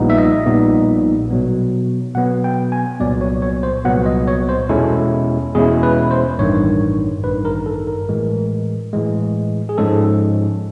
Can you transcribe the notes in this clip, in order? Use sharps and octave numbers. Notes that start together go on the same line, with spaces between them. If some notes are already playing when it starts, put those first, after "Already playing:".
Already playing: A#1 A#2 G3 B3 D#4
E5
D#5
A#1 A#2 G3 B3 D#4
B2 F#3 B3
B2 F#3 B3 F#5
G5
G#5
C2 A#2 F#3 B3 D5
C#5
C#5
C5
C2 A#2 F#3 B3 F#5
D#5
C#5
C5
E2 B2 G#3 C#4 E4 A4
E2 B2 G#3 C#4 E4 G#4
B4
C5
A1 G2 D#3 C#5
A1 G2 D#3 B4
A#4
A4
A#4
A2 E3 G#3
A2 E3 G#3
G#4
G#2 F3 G#3 C#4 A4